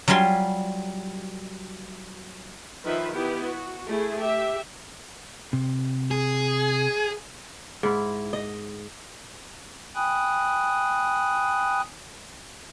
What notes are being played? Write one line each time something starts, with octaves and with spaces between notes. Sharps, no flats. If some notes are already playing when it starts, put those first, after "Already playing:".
F#3 G3 F4 G#5 C6
D#3 F3 B4 E5
B3 E4 G4
F#4
A3 E4 G#4
G4 E5
C3
G#4
G#2 E4
D#5
G5 G#5 B5 D#6 F#6